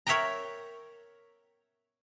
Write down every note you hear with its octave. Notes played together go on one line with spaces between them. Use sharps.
A#4 C#5 E5 F#5 G5 A#5